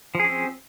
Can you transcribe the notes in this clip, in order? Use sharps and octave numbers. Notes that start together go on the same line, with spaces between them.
F3 C4 C#4 G#4